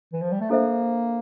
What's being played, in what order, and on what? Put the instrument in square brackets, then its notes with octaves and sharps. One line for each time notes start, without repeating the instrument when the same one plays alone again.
[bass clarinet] E3
F3
G3
A3
[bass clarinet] A#3 [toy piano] D4 A4 C5 E5